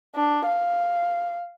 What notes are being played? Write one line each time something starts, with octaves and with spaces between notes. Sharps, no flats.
D4
F5